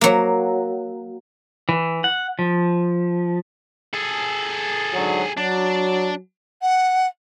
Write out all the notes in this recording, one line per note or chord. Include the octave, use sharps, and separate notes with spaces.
F#3 A#3
E3
F#5
F3
G#4 A4
G#2 D3 F#3
F#3 D4
F#5